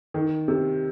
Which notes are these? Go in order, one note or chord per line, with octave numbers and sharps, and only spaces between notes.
D#3
C3